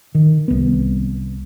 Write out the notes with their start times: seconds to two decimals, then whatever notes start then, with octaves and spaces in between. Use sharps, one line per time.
0.15 D#3
0.48 C2 B3